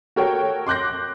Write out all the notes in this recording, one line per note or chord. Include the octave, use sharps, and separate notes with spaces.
F#4 A4 A#4 C#5 G5
C6 D6 F#6 G6 A#6